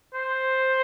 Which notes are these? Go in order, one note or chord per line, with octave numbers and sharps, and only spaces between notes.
C5